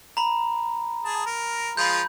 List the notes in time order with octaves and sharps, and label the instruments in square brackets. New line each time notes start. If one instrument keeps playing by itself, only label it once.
[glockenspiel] A#5 B5
[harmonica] G#4 A5
A#4
[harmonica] F3 G#3 F4 [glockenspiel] B5 G6